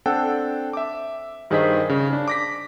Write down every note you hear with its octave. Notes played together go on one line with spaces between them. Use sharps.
C4 D4 A4 C5 F#5 G5
E5 D6
G2 D#3 G#4 C5 D#5 B6
C#3
D4
D6 A#6 B6